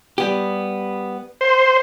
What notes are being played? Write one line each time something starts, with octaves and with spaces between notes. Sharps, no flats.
G3 B3 G4
C5